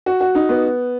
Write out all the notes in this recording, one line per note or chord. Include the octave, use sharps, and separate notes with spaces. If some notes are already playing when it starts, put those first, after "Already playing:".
F#4
F#4
D#4
B3